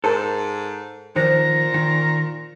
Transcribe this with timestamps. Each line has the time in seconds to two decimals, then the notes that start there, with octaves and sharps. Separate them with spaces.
0.04 G#2 A4 A#4
1.16 A#2 D#3 F3 C5 A#6
1.74 D#3